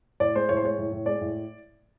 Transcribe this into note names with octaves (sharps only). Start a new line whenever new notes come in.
A2 D5
G#3 C5
A2 C#5
C5
G#3 C#5
A2
A2
G#3 D5
A2